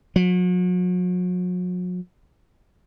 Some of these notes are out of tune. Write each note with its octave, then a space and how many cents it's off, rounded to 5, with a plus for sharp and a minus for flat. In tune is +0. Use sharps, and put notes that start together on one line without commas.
F#3 -40